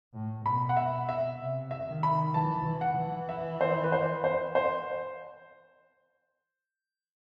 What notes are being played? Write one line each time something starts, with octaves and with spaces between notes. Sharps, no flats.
A2
B2 B5
F#5
E5
B2
E5
C3
E5
D#3
B5
E3 A5
E3
F#5
E3
E5
C5
B4
C5
C5
C5